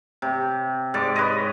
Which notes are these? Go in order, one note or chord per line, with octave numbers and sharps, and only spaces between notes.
C3
G#2 D5 D6
B4 C#5 D#5